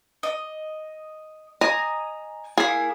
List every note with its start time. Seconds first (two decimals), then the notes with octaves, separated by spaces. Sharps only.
0.23 D#5
1.61 D#5 G#5 A#5 D#6
2.58 A#3 E4 G#4